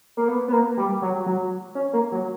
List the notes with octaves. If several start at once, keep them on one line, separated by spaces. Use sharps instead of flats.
A#3
B3
B3
A#3
G3
F#3
F#3
C#4
A#3
F#3